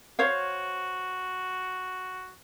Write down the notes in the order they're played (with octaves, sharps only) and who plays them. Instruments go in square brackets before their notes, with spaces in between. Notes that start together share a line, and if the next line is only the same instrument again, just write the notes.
[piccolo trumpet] F#4 [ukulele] C5 C#5 F5